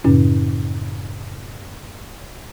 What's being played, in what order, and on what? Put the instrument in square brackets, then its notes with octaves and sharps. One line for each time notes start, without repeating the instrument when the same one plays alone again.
[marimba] F#2 A2 C#3 C#4